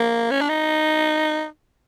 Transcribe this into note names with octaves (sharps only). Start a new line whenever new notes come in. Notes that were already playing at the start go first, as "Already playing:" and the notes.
Already playing: A#3
C#4
D4
D#4